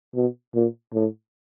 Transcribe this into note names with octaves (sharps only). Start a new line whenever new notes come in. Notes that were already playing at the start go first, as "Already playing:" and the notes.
B2
A#2
A2